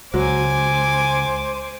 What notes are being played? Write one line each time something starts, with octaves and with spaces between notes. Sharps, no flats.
C#2 F#3 C5 G#5 D6